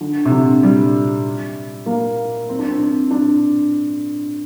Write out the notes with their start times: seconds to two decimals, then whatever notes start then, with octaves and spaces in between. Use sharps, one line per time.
0.01 D3
0.25 C3
0.31 D3
0.63 G3
1.86 A#3
2.49 C4
2.59 D4
2.68 C4
2.79 D4
3.11 D4